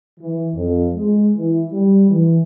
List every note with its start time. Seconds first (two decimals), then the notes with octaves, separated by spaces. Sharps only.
0.19 E3
0.54 F2
0.93 G#3
1.34 E3
1.71 G3
2.08 E3